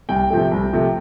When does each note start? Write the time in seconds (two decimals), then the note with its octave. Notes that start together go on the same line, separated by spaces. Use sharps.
0.09 C2 G5
0.30 C3 F3 A3
0.51 C2
0.73 C3 F3 A3